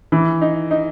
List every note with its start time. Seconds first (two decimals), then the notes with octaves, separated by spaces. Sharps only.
0.12 E3
0.41 D#4
0.71 D#4